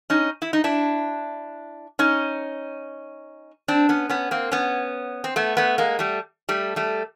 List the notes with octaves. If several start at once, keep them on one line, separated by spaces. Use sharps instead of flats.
C#4 D#4
E4
D#4
D4 E4
C#4 D#4
C4 D4
B3 C#4
B3 C#4
A#3 C4
B3 C#4
C4
A3 B3
A3 B3
G#3 A#3
G3 A3
G3 A3
G3 A3